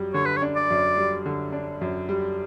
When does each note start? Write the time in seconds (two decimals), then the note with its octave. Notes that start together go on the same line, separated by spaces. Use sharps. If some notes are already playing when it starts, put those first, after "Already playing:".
Already playing: F#2 G3
0.14 D3 C#5
0.26 B4
0.37 C#5
0.42 D4
0.56 D5
0.70 F#2
0.97 G3
1.26 D3
1.52 D4
1.81 F#2
2.09 G3